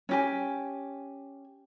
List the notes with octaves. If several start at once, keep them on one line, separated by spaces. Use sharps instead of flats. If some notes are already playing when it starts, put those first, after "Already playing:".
C#4 G4 G#5